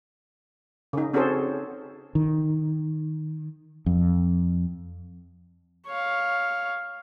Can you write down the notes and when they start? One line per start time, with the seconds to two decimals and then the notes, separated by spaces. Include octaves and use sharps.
0.93 C#3 D#4
1.14 C4 C#4 F#4 G#4 A4 C5
2.15 D#3
3.86 F2
5.86 C#5 F5